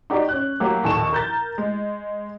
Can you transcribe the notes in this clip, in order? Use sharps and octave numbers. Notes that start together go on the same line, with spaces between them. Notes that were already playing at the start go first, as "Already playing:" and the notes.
D#4 F#4 G4 D5
C#4 F#6
F#3 A#3 G4
A#1 D#2 A4 A5 C#6 E7
A#4 G6 A6
G#3